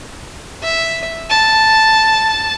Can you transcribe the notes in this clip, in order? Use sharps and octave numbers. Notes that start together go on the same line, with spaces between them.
E5
A5